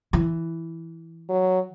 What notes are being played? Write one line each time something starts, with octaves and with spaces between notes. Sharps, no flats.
E3
F#3